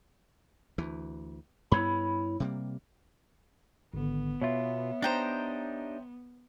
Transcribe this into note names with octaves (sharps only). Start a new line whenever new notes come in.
D2 E3
G2 B3 E4 C#5 B5
C3 G3 A#3
G#1 D3 B3
B2 F4 C#5 E5
D4 D#4 G4 C5 G5 A#5